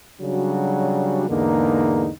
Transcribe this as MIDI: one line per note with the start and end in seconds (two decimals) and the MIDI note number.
0.21 1.26 49
0.21 1.26 54
0.21 1.26 55
0.21 1.26 62
0.21 1.26 66
1.29 2.10 40
1.29 2.10 44
1.29 2.10 50
1.29 2.10 58
1.29 2.10 63